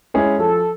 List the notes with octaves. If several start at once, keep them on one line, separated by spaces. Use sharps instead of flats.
G#3 C#4 E4 G#4
F3 A4